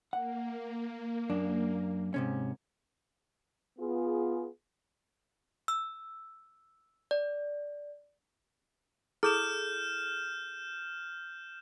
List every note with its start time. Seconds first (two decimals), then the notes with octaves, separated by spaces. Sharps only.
0.13 A#3 F#5
1.30 F#2 D4
2.14 G#2 C3 C#4
3.79 B3 F4 G#4
5.68 E6
7.11 D5
9.23 E4 G#4 A4 F6 G6 E7